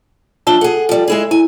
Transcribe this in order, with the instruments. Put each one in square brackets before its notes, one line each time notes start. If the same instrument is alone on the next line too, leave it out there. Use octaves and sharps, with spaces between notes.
[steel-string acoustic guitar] F3 D4 E5 [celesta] A5 G7
[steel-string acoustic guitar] G#4 F#5 [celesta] A4
[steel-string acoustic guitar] F3 G3
G#3 E4 G#4
[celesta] E4 [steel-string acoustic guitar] G#5